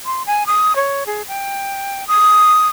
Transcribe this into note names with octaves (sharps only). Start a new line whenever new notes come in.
C6
G#5
D#6
C#5
G#4
G5
D#6